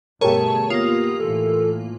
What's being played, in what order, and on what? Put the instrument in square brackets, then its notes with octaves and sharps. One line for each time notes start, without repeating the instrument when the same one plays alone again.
[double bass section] G1 B2 A3 [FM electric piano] G4 A#4 [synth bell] G#4 C#5 [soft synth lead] A5
[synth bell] A#3 F4 [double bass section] B3 [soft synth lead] D#6
[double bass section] A2 E3 [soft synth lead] A4